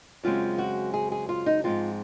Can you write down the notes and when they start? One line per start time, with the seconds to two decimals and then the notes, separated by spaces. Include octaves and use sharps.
0.24 F#2 C#3 G#3 C4 F4
0.58 F#4
0.94 G#4
1.12 G#4
1.29 F4
1.46 D#4
1.64 G#2 F3 G#3 C4 F4